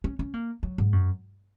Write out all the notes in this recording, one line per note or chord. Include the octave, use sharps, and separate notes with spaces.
C#4
C#4
A#3
F#3
G#2
F#2